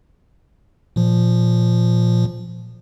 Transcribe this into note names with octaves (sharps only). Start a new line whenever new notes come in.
A#2 F3